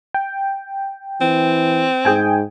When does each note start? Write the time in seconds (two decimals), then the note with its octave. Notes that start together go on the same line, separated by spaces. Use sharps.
0.14 G5
1.21 E3 C4
2.05 G#2 G#4 G5 G#5